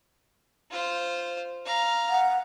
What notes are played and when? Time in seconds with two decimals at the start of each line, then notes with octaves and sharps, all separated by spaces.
0.71 F4 C5
1.65 F5 A#5
2.09 F#5